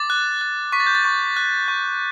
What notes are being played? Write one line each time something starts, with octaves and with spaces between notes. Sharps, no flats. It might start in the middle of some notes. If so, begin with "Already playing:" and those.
Already playing: D6 A6
F#6
F#6
C#6 B6
A6
G6
A6
C#6
F#6
C#6 G6